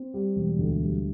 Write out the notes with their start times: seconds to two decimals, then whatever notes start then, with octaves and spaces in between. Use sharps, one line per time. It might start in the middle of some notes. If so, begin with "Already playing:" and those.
Already playing: C4
0.14 G3
0.36 E1
0.59 D2
0.81 G3